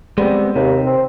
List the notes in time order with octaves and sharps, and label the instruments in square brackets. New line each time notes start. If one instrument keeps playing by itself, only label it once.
[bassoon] G3 [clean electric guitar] G#3 B3 C4
[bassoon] D#2 [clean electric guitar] C3
[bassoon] C4